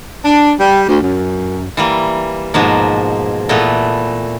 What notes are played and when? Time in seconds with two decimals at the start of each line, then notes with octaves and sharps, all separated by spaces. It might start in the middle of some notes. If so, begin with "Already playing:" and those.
0.25 D4
0.60 G3
0.89 D2
1.02 F#2
1.77 E3 G3 A#3
2.54 G#2 B2 F3 A#3
3.49 A#2 E3 A3 B3